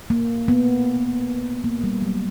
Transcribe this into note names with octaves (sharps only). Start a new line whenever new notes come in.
A#3
B3
A#3
G3
F#3